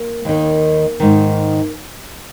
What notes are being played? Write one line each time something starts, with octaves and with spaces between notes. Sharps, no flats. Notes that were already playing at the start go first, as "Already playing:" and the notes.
Already playing: A#3
D#2 D#3
G#2 D#3